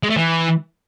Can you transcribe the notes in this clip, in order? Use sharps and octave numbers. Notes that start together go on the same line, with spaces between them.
G#3
A3
E3